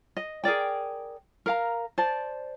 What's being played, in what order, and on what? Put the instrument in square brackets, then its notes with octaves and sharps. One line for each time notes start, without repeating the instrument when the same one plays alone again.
[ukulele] D#5
G#4 A#4 D5 G5
A#4 F5 A#5
C5 D5 A5